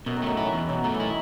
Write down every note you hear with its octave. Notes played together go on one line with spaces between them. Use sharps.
F#2 B2
D#3
F#3 A3
E3 E4
E2
B2 F#3
F#3 A3
E3
D#3 E4